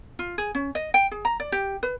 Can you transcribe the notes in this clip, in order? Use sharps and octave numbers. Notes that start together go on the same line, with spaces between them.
F4
G#4
C#4
D#5
G5
G#4
A#5
D5
G4
B4